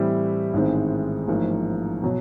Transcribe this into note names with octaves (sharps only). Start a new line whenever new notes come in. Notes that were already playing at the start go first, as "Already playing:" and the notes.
Already playing: A2 E3 G3 C4 E4
A1 G#2 D#3 G#3 C4
A1 G#2 F3 A#3
B2 F#3